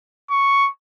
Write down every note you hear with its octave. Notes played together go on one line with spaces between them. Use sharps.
C#6